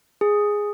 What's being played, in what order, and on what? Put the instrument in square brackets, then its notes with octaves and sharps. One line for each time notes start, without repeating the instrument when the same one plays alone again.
[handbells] G#4